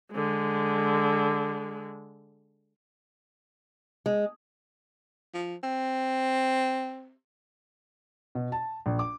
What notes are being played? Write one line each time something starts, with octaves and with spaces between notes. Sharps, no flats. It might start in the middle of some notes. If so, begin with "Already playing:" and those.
D3 G#3
G#3
F3
C4
B2
A5
A#1
D6